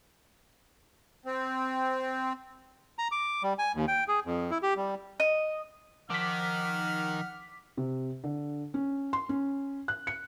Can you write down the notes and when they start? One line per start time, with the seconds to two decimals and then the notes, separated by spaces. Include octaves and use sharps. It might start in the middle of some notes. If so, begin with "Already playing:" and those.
1.26 C4
2.99 A#5
3.12 D6
3.43 G3
3.59 G#5
3.75 D#2
3.88 G5
4.08 G#4
4.25 F2
4.51 E4
4.63 G4
4.77 G3
5.20 D#5
6.10 D#3 F3 F#5 A5 D6 F6 B6
7.77 C3
8.24 D3
8.74 C#4
9.13 C6
9.29 C#4
9.88 F#6
10.07 C#7